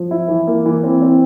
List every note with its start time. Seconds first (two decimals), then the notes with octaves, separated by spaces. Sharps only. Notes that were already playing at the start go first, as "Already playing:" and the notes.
Already playing: F3
0.11 E4
0.28 E3
0.47 A#3
0.66 E3
0.83 C4
1.02 C4